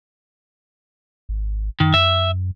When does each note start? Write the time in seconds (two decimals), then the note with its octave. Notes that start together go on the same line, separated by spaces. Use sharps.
1.29 G#1
1.80 F#2 D#3
1.94 F#2 E5